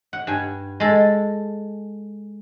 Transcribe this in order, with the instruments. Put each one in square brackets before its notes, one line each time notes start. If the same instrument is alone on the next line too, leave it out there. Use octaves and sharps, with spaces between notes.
[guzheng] F#5
G2 G#5
G#3 A4